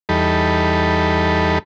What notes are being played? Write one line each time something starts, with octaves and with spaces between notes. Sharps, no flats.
E2 G3 D#4 A4 B5